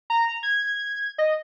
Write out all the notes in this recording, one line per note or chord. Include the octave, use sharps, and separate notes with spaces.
A#5
G#6
D#5